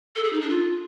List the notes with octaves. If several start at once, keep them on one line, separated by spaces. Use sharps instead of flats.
A4
G#4
D#4
D4
F4